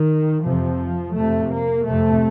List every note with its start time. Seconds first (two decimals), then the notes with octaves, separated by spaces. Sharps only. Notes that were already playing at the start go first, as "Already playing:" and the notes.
Already playing: D#3
0.45 F2 C3 F3
1.15 F2 C3 A3
1.52 A#3
1.86 F2 C3 A3